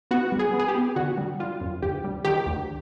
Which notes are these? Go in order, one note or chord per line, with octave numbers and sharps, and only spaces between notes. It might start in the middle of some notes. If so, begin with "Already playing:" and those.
B3 F#4
G3
G#4
B3
G#4
G4
B3
D3 F#4
G3
G3 F4
F#2
D2 G4
G3
D#3 G4
D2